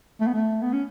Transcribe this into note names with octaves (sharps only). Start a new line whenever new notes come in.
A3
B3
A3
B3
C#4